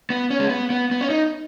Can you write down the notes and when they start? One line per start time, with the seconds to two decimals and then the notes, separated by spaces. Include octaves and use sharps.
0.10 B3
0.30 C#4
0.40 G#3
0.50 B3
0.70 B3
0.91 B3
1.01 C#4
1.10 D#4